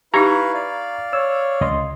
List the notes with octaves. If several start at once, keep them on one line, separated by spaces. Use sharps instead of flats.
D#4 E4 G4 B4 F5 A#5 C#6 G#6
D5 F5
C#5 E6
C#2 D#5 C6